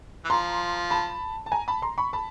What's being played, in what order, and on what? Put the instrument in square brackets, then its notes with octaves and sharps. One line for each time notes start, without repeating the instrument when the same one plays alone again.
[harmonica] E3
[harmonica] F3 [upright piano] A#5 C6
[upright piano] A5 B5
A5
G#5 A#5
A5 B5
A#5 C6
B5 C#6
A5 B5